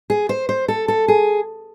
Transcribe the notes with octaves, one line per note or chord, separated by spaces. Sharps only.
G#4
C5
C5
A4
A4
G#4